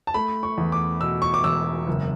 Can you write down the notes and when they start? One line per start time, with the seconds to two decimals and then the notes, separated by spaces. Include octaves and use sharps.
0.07 A5
0.14 A3 B5
0.43 C#6
0.58 E2
0.72 D6
1.01 B2 E6
1.22 C#6
1.34 D6
1.44 E1 E6
1.87 F#1